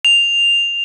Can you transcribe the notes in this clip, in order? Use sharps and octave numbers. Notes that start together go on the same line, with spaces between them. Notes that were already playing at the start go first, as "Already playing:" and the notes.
F7